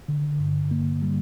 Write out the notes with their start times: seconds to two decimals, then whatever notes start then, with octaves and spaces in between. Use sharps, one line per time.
0.08 D3
0.39 G2
0.71 A#3
1.02 G3